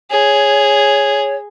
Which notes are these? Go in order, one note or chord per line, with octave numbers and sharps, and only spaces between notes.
G#4 C#5